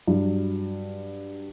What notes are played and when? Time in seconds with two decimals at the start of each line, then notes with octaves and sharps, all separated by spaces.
0.07 G2 F#3 F#4